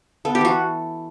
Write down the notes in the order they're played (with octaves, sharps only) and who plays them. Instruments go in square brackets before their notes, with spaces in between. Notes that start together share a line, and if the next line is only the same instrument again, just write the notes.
[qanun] B3 A4
G4
E3 F#4